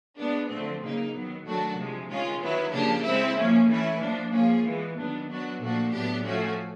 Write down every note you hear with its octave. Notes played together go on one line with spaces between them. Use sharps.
G#3 B3 D4
D3 F3 A3 C4
C#3 F#3 A#3 D#4
D#3 F#3 B3
D#3 F#3 A3 D4 F#4
C3 F3 G#3
D#3 G#3 C#4 F4
D#3 F#3 B3 E4
C#3 F3 A#3 D4 G4
G#3 C4 E4
F3 A#3 C#4
E3 A3 C#4 E4
F3 A#3 D4
F3 A#3 C#4 F4 G#4
E3 G#3 B3
D#3 F#3 B3 D4
F#3 B3 D4 F#4
A#2 F3 A3 D4 F#4
A2 F#3 B3 D4 G4
F3 A3 C#4 F#4